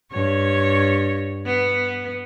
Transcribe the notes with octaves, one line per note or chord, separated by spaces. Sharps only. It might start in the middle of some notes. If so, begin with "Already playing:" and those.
G2 C#5
B3